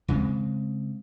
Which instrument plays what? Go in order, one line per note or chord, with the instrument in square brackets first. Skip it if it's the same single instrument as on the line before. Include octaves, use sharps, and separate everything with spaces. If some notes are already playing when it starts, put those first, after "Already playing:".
[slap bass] C#3 G#3 A3 C4